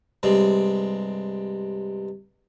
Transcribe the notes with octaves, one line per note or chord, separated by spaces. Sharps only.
G2 C3 G#3